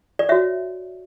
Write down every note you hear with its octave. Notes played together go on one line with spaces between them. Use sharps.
D5
F#4 C#5 E5